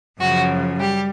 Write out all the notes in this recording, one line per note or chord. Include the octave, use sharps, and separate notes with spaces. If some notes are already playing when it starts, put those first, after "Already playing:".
F#2 C#3 F3 F#4
G3 G4